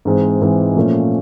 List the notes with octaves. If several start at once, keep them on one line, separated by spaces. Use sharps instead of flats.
G#2 E3 G#3 C4
G#2 E3 G#3 C4
A#2 F3 A3 C#4